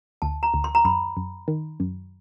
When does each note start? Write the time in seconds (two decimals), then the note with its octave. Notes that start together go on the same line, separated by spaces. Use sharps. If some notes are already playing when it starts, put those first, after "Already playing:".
0.22 D2 A5
0.43 A#5
0.54 D2
0.64 C6
0.75 A#5
0.85 F#2 B5
1.17 F#2
1.48 D#3
1.80 F#2